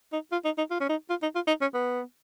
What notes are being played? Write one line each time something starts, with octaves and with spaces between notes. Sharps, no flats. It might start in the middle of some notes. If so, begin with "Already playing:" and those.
D#4
F4
D#4
D#4
F4
C#4
D#4
F4
D#4
F4
D#4
C#4
B3